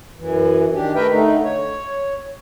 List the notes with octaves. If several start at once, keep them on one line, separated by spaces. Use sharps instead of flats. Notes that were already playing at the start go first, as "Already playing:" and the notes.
F#2 E3
D#3 D4 G4
A3 A#4 B4 E5 G5
D3 A3 D#4
C#5